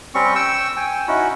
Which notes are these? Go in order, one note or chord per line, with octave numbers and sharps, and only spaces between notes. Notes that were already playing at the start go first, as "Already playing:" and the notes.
G3 C4 C#4 C#6
G5 C#6 E6
G5 G#5
C#4 D#4 E4 F#4